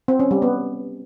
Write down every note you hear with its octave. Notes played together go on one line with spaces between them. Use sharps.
C4
C#4
G3
B3